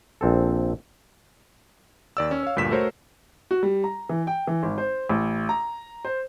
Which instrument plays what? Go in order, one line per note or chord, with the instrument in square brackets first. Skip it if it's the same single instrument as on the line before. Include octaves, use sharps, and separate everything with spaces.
[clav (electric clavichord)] A#1 C4 A4
[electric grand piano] D#2 D5 E6
C#4
C#5 F5
D2 G2 A#2 B6 E7
A3 F#4 A#4 C5 C#5
[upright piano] F#4
G3
A#5
E3
G5
E3
G#1
C5
A1
A#5
C5